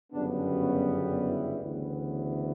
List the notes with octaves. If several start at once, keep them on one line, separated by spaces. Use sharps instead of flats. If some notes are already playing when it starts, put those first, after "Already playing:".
G1 F#2 C#3 G3 B3 D4
F#4
E4
D2 C#3 E3 B3